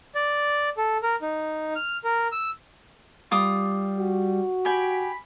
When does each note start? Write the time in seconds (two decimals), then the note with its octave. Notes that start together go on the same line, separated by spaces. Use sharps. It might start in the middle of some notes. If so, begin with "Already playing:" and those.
0.15 D5
0.77 A4
1.03 A#4
1.22 D#4
1.76 F6
2.04 A#4
2.32 E6
3.31 G3 F4 D6 D#6
3.99 F#4
4.65 G4 G5 G#5 B5